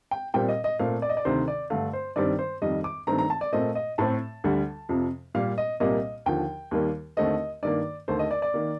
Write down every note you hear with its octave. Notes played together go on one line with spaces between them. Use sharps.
G5
A#2 G3 C4 G5
D#5
D#5
A#2 A3 C4 F5
D5
D#5
D5
D2 C3 D#3 C5
D5
G2 D3 A3 F5
C5
G2 D#3 G3 C4 D5
C5
F2 D#3 G3 D#5
D6
G2 D#3 A3 C4 A#5
A#5
A5
D5
A#2 A3 C4 D#5
D#5
A2 A3 C4 A5
D2 D3 G3
F2 C3 F3
A#2 G3 A#3 F5
D#5
C2 A#2 G3 A#3 D#5
D#2 D3 F3 G5
D#2 D#3 G3 A#3
D#2 D3 A3 C4 D#5
G2 D#3 A#3 D5
D#2 D3 A3 C5
D#5
D5
D5
D#3 A#3